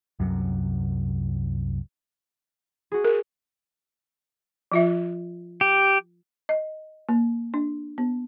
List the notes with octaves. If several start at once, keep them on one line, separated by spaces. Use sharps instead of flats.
C2 F#2 C3 F#3
F#4 G#4
A#4
F3 F4 E5
G4
D#5
A#3
D4
B3